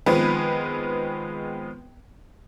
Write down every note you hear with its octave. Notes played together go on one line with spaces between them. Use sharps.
D#3 F3 G#3 B3 C4 B4